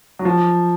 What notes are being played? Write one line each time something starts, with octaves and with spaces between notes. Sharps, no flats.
F#3
F3